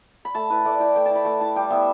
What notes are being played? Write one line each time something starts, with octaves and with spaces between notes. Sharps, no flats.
B5
A3 A5
E4 B4
A3 D5
E4 G5
A3 G5
E4 A5
B5
A3 A5
E4 A5
G3 G4
B3 E4 E5